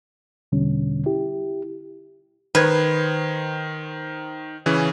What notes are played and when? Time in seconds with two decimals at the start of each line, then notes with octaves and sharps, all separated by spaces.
0.52 E2 B2 D3 G3 C#4
1.06 E4 G4
2.55 D#3 B4 C5 G#6
4.66 C#3 E3 C#4